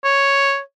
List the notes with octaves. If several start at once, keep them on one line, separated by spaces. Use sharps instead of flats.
C#5